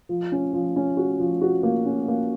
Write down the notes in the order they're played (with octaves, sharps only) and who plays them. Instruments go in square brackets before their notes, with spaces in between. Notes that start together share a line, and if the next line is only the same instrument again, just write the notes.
[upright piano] F3
C#4
F3
C#4
F#4
F3
F#4
A#3
C#4
A#3